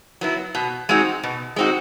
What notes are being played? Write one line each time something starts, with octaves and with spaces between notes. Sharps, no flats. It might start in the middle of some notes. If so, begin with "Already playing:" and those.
F#3 B3 E4
B2
G#3 C4 D#4 F#4
B2
G#3 C4 D#4 F#4